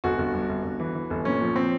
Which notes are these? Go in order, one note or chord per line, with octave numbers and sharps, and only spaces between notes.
G1 F#4
G1
G2
G1
G1
E3
E3
G1
A#2 C#4
F3
C4